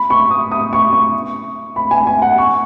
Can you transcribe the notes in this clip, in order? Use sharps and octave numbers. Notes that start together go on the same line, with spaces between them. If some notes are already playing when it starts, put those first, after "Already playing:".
Already playing: B5
C#6
D#6
D#6
C#6
C#6
B5
G#5
G#5
F#5
C#6